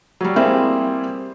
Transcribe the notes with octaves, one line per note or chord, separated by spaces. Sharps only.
F#3 G3
G3 A#3 C4 E4 G4 G#4